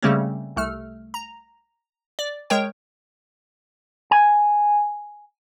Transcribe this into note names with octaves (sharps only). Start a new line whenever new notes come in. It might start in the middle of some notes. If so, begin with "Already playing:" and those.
C#3 G3 A3 A#3 C4 C#4
C2 A3 F6
A#5
D5
G#3 A#4 C#5 G5
G#5